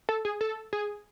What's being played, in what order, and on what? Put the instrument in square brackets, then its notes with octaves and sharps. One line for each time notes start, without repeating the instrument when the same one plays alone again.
[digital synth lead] A4
G#4
A4
G#4